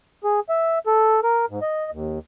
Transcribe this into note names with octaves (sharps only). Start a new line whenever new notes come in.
G#4
E5
A4
A#4
G#2
D#5
D#2